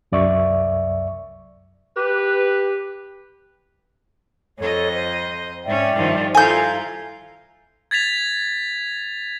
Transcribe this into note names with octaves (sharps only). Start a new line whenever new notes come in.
C2 F#2 D5 E5 C#6
G4 B4
F2 A4 C#5 D#5
C5
G#2 C#4 D5 E5 G5
G2 D#3 F3
E4 F4 A4 F5 G#5 A#5 G6
G#6 A6 B6 F7